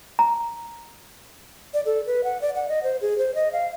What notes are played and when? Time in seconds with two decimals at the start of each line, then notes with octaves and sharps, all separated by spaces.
0.19 A#5
1.74 D5
1.86 A4
2.06 B4
2.24 F#5
2.41 D5
2.55 F#5
2.69 D#5
2.83 C5
3.01 G#4
3.18 C5
3.35 D#5
3.53 F5